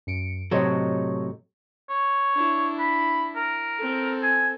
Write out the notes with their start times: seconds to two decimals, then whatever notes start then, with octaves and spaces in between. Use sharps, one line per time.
0.07 F#2 C#7 D7
0.51 A2 C3 F#3 A4 C#5 D#5
1.89 C#5
2.35 D4 E4
2.79 B5
3.36 A#4
3.78 C4 A4
4.23 G#5